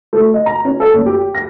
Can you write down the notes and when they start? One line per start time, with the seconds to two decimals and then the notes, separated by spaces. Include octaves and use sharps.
0.13 A3
0.34 D#5
0.46 A#5
0.65 C#4
0.80 A4
0.94 F#1
1.06 G4
1.35 A#6